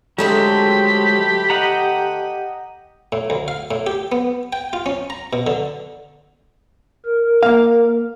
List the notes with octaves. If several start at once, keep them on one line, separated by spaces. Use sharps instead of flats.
D3 F#3 G#3 A3 C4 G4 B5
D#5 F#5 A#5
A2
D2
F5
A2
G4
B3
G5
F4
C#4
A#5
B2
D3
A#4
A#3 F5